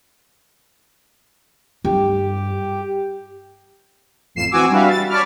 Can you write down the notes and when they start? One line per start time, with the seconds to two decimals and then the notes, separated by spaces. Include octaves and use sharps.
1.84 G2 G4
4.35 A1 F2 C7 E7
4.51 E3 C4 F#4 G#5 D6 E6
4.70 G3 D4 F#4 B4 E5 F5
4.89 A6
5.09 C#5 D5 A5 B5 D6 F6